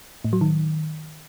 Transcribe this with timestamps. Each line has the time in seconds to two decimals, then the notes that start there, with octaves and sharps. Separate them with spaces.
0.25 A2
0.33 F#3
0.41 D#3